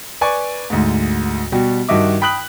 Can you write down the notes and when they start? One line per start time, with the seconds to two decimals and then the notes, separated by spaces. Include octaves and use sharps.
0.21 B4 D5 G#5 C#6
0.70 D2 G#2
1.52 B2 G3 F#4 G4
1.89 G2 D#3 F#4 D#5 E5 D6
2.21 G5 B5 D#6 F#6 B6 F#7